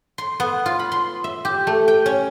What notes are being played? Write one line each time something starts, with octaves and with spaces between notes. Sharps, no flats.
C6
B3
F4
B5
C6
E5
G4
A3
G5
C#4